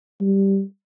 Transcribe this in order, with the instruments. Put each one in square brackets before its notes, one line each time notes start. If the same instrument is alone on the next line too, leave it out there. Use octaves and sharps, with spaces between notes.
[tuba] G3